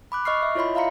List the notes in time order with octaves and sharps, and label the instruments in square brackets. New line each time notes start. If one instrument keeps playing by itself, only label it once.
[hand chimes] B5 D6 F#6
D#5 C#6 F6 C7
E5
E4 F4 C#5 D#5 B5 C6
E5 F5 A#5 C6 C#7